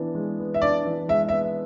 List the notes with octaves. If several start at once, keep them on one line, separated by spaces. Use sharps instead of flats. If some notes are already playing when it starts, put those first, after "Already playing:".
Already playing: E3 B3 D4
G#3
B3
E5
D4 D5
E3
G#3 E5
B3 E5